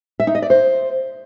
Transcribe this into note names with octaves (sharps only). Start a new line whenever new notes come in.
E5
D#4
D#5
D5
C5